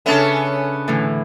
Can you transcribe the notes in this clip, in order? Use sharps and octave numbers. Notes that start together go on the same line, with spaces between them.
C#3 B3 C#4 D4 A4 E5
A2 D3 E3